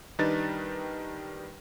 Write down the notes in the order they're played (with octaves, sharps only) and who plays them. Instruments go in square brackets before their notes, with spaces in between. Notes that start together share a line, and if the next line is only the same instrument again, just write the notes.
[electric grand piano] D#3 G3 D4 D#4 B4 A6